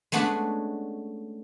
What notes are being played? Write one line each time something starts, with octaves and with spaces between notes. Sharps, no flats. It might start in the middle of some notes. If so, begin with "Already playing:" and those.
G#3 A3 B3 C#4 D4 F#4